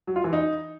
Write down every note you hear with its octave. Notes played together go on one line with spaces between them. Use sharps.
F#3
F4
E3
D#4